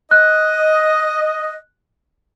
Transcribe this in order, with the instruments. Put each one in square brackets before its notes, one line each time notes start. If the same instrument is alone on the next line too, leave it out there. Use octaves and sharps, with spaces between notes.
[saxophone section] D#5 [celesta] F#6